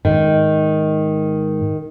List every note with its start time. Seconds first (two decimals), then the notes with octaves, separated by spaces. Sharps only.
0.05 G#2 D#3